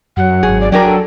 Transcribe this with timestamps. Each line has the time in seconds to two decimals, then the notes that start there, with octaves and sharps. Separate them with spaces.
0.17 F#2 F#3 F#5
0.43 G#1 G#4
0.61 D5
0.72 F#3 D4 G#4 A#4 D5 G5
0.87 A4